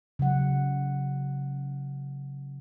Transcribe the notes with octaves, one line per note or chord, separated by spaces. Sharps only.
C#3 F#3 F#5